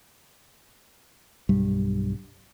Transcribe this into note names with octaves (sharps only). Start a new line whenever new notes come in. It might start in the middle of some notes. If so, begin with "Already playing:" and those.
B1 G2 G3